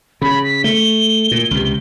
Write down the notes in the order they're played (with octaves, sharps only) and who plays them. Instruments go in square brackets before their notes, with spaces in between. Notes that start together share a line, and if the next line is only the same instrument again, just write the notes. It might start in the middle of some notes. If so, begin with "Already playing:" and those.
[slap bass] C#3 [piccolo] B5
[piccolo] B6
[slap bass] A3 [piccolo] G7
[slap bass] A#2
C#2 C3